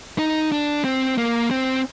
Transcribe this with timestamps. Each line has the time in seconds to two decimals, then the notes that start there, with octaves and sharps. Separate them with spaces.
0.19 D#4
0.52 D4
0.84 C4
1.18 A#3
1.51 C4